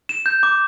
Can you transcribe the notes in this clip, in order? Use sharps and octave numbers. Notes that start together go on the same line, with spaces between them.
E7
G6
D6